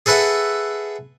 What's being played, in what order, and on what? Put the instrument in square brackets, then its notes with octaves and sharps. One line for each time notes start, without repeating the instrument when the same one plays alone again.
[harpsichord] G#4 A4 B4 E5 F#5